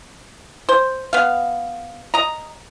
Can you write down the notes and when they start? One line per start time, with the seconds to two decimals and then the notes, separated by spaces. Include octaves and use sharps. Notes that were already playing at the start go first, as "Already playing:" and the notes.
0.69 C5
1.13 B3 F5
2.14 D#5 A#5